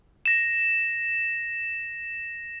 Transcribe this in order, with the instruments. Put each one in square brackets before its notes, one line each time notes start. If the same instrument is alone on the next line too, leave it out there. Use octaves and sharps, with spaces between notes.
[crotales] A#6 E7